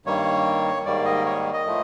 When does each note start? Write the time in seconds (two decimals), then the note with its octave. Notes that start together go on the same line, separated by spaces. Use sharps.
0.06 G2 D#3 G3 A#3 C#5
0.86 G#2 D#3 G3 A#3 D5
1.05 D#5
1.26 C#5
1.53 D#5
1.66 A2 F3 A3